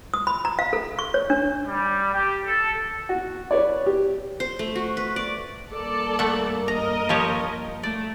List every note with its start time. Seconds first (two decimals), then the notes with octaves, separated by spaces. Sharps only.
0.14 D#6
0.27 B5
0.45 A#5
0.59 F5
0.73 A4
0.99 C#6
1.14 C#5
1.30 D4
1.67 G3
2.13 G4
2.45 A4
3.09 F#4
3.51 B4 C#5 D5
3.86 G4
4.40 C5
4.59 A3
4.75 F#4
4.97 B4
5.16 D5
5.71 G2 A#3 A4 D5 A5
6.19 A3 F#5
6.68 A#4 D#5 A#5
7.09 F3 G4 C#5
7.83 A3 D5